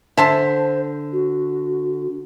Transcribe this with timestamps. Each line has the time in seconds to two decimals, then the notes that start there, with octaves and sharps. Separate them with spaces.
0.17 D3 C5 E5 A5 C6
1.12 F#4